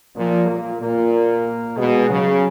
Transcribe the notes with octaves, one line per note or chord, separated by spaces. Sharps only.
A#2 F3
A#2 A#3
A#2 A#3
A#3
B2 G#3
C#3 F#3